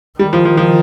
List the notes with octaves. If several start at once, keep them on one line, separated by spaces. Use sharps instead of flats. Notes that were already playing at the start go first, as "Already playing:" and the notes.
D#3 G3
F3
F3
F3